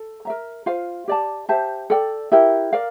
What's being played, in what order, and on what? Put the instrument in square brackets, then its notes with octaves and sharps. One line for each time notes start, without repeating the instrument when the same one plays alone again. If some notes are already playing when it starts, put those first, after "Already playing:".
Already playing: [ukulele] A4
A#4 E5 A#5
F4 C5 F5
G4 D5 A5
G4 C5 E5 A5
A4 D5 G5
E4 G4 A#4
A#4 D5 F5